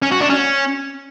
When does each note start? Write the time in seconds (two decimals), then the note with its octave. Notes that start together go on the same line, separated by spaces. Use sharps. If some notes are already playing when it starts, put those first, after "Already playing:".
0.02 C#4
0.11 F#4
0.21 D4
0.30 C#4